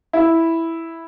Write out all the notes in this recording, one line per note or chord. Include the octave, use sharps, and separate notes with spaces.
E4